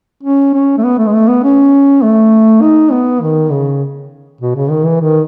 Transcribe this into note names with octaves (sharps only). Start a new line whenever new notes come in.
C#4
C#4
A3
B3
A3
G#3
A3
B3
C#4
A3
D#4
B3
D#3
C#3
B2
C#3
D#3
E3
D#3